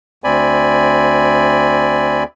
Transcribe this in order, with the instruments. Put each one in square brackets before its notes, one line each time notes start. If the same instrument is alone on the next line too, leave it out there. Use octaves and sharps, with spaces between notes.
[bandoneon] D2 C4 D5 G#5 B5